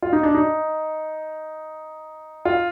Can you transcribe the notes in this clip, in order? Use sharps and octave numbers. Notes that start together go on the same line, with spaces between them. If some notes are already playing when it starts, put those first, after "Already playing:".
F4
D#4
D4
D#4
F4